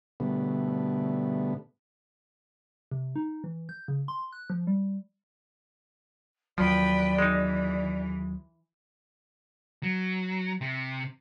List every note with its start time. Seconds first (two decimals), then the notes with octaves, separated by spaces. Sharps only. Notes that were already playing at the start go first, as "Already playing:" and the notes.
0.20 B2 D3 G3 A3 B3
2.91 C3
3.16 D#4
3.44 E3
3.69 G6
3.88 C#3
4.08 C6
4.33 F#6
4.50 F3
4.67 G3
6.58 D#2 F3 F#3 B4 D5 G5
7.18 E3 G#3 D#4
9.83 F#3
10.61 C3